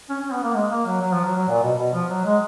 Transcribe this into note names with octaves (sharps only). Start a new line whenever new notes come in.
C#4
C#4
B3
A#3
G#3
A#3
F#3
F#3
F3
F#3
F#3
A#2
B2
B2
F3
F#3
G#3